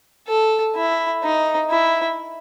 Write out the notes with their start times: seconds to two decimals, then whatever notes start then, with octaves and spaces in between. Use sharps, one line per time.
0.28 A4
0.75 E4
1.23 D#4
1.70 E4